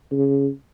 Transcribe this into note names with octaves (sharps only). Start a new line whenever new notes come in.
C#3